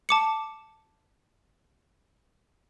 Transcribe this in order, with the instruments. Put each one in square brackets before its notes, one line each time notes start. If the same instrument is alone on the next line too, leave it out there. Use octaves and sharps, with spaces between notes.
[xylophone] A5 D6 C#7